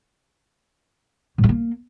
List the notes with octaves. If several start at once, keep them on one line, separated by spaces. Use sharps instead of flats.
A2
G#3
A#3